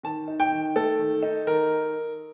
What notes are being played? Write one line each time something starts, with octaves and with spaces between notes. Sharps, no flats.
D#3 A5
D#4
G5
D#3
A3 A4
D#3
D#4
D#3 A#4